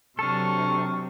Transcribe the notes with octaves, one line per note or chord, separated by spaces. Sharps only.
C3 F#3 D4 A4 C#6 F6